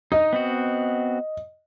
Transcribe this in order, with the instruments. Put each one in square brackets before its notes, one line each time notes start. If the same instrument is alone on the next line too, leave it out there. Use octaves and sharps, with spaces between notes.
[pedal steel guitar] D#4 [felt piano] D#5
[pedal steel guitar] B3 C4 F#4